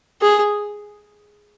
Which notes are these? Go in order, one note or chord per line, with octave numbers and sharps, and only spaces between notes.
G#4